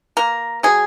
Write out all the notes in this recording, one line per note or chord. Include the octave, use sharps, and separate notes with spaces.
A#3 A#4
F#3 G#4